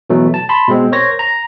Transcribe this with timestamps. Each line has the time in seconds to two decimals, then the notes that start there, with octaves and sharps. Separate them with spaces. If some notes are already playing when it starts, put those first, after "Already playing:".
0.10 B2 E3 F#3 A3
0.34 A5
0.49 A5 B5 C6
0.68 B2 G#3 C4
0.92 A#4 C5 C#5 A#6
1.19 A#5